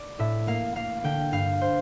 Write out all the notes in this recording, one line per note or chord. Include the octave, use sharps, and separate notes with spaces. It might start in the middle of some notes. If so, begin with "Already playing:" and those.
Already playing: D5
A2 E5
A#3 F5
A#3 F5
D3 G5
G2 F5
C5